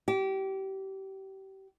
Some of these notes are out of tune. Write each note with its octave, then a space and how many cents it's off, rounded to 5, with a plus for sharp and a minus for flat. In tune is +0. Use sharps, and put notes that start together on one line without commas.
G4 -30